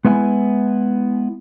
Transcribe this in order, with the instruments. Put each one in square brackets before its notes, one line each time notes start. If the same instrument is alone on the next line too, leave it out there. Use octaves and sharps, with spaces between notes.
[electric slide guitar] G#3 B3 E4 G5 G#5